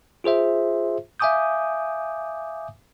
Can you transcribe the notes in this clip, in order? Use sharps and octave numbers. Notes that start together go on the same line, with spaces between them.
F4 G#4 C5 E5
E5 F5 G#5 D6 D#6 G6